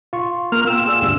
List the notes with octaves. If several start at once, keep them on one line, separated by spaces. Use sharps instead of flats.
F4 C#6
A#3 F6
F4 G5 E6
F4 G#4 D5
D2 G2 C3